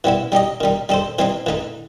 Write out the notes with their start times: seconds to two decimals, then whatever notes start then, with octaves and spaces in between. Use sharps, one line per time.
0.04 E3 G3 B3 E4
0.32 G3 D#4 G4 D#5
0.60 D#3 G3 D#4
0.89 G3 D#4 A4 C5
1.19 E3 G3 C4 D#4
1.46 E3 A3 D#4